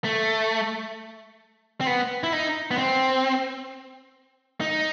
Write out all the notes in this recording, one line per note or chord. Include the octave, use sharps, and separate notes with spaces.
A3
C4
B3
E4
D#4
B3
C4
D#4